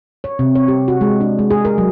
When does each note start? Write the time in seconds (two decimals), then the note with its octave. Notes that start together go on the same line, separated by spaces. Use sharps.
0.24 C#5
0.39 C3
0.55 C#5
0.68 G4
0.88 F#4
1.01 G#3
1.21 D4
1.39 G#3
1.51 G#4
1.65 A#4
1.78 F#3